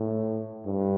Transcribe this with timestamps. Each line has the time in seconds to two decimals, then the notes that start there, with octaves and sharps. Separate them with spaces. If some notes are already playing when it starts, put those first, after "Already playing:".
Already playing: A2
0.66 G2